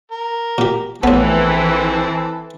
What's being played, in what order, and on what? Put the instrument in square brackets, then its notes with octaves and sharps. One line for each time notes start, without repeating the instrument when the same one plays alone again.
[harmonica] A#4
[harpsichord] A#2 G4
[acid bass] A#1 [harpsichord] A2 B3 [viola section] E3 [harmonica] C4 A4